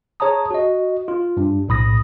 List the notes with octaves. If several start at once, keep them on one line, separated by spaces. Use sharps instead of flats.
G#4 C#5 A5 A#5 D#6
F#4 D#5
F4
G2
B1 A2 B5 D#6 A#6